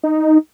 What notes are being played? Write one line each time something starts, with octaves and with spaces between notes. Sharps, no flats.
D#4